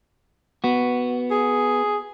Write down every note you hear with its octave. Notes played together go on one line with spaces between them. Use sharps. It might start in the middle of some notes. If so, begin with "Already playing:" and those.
B3 F#4
G#4